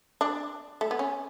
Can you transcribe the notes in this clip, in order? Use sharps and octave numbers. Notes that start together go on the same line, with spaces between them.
D4
A3
B3
C#4